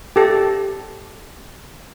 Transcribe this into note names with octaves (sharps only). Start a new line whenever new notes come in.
G4 A4